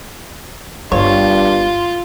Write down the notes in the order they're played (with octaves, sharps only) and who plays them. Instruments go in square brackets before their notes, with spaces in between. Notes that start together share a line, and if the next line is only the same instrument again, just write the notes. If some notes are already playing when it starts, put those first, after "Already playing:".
[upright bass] G1 [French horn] G2 [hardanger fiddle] F4 [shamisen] C#5